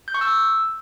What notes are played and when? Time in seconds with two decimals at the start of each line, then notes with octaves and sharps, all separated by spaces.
0.08 G6
0.14 C#6
0.21 E6